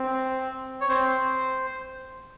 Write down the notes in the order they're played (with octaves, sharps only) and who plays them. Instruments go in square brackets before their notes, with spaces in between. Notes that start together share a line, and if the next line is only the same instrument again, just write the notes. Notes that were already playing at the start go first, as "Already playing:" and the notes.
Already playing: [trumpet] C4
[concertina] C#5
[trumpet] C4 [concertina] C5